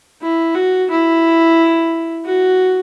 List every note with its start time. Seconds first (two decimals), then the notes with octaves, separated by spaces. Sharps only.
0.22 E4
0.55 F#4
0.90 E4
2.25 F#4